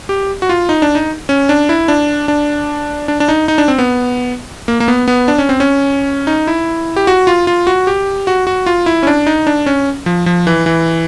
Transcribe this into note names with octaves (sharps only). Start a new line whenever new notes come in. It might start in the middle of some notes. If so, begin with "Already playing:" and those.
G4
F#4
F4
D#4
D4
D#4
C#4
D4
E4
D4
D4
D4
D4
D#4
D#4
D4
C4
B3
A#3
A#3
B3
B3
D4
C#4
C4
C#4
D#4
E4
G4
F#4
F4
F4
F#4
G4
F#4
F#4
F4
E4
C#4
D4
D#4
D4
C#4
F3
F3
E3
E3